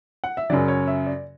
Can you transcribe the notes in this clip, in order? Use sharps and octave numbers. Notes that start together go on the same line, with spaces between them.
F#5
E5
F#2 C#3 F#3 D5
C#5
E5
D5